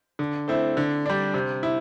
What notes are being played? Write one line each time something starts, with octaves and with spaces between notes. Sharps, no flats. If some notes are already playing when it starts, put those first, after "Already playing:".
D3
A3 C4 E4
D3
G3 D4
C3
E4